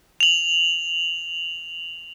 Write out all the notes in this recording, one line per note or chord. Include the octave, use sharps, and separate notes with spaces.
F7 F#7